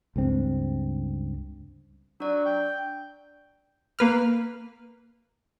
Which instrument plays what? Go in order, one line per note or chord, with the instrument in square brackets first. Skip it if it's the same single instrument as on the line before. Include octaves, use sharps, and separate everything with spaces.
[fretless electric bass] C#2 G2 C4
[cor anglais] F#3 [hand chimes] D4 D5
[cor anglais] G5
[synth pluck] A#3 B4 F6